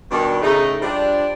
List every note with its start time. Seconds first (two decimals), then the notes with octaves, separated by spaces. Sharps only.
0.11 G2 B2 D#3 G3 D4
0.42 A2 C#3 A3 D#4
0.81 F3 G3 D4